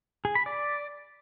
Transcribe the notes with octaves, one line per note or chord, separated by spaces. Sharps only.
G#4
B5
D5